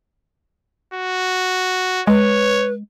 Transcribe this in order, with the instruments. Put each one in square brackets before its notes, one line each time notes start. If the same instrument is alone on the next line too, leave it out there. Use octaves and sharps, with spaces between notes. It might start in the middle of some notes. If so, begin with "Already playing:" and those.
[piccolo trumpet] F#4
[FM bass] G#3 [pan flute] B4 [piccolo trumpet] C#5